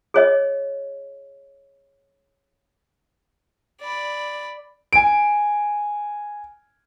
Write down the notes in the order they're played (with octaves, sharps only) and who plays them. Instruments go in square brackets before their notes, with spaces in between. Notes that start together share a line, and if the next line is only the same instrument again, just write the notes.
[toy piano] G#4 C#5 D#5
[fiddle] D5 B5
[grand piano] G#5 D7